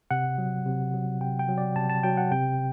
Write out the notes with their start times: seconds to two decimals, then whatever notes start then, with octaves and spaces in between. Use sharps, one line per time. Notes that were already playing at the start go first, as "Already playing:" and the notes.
0.11 C3 F#5
0.38 F#3
0.66 C3
0.94 F#3
1.21 C3 G5
1.39 G5
1.49 F#3
1.58 D5
1.76 C3 A5
1.90 A5
2.03 F#3 G5
2.17 F#5
2.32 C3 G5